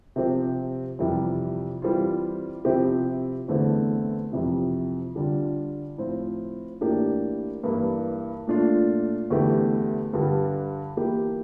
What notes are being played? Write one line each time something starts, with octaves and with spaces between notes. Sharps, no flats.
C3 F3 C4 G4
F2 C3 E3 G3
E3 G3 C4 F4
C3 F3 C4 E4 G4
E2 D3 A3 C4 E4
F2 C3 E3
D3 G3 D4 F4
A2 F3 C4 F4
A2 E3 A#3 D4 G4
G2 E3 A#3 E4
A#2 A3 D4 F4
E2 D3 A3 E4 G4
G2 D3 G3
E3 A#3 E4 G4